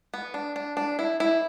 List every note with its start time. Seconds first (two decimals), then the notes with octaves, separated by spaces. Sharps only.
0.14 B3
0.34 D4
0.56 D4
0.77 D4
0.99 E4
1.20 E4